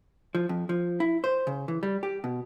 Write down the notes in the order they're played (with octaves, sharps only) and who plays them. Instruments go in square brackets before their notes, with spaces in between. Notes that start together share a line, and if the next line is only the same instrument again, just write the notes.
[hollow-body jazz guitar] F3
F2
F3
E4
C5
C#3
E3
G3
G4
B2